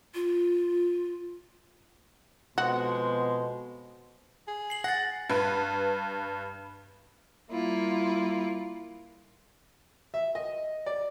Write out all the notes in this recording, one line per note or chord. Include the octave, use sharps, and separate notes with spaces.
F4
F2 B2 G#3 B3 F#4 C5
G#4
C7 F#7
F#5 A6 A#6
G2 B4
G3 A#3 E4 F4
E5
D#5
D5